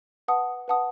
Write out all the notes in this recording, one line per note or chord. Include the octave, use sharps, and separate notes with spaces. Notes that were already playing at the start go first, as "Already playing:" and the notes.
B4 F#5 A5 D#6
B4 F#5 A5 D#6